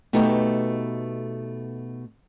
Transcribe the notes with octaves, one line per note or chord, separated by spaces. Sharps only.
B2 A3 B3 D#4 G4